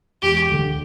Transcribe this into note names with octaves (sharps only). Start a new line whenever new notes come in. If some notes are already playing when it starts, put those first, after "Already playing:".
E1 G4
D2 D3